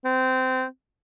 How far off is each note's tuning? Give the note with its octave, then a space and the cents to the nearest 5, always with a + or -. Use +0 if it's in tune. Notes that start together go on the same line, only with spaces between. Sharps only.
C4 -20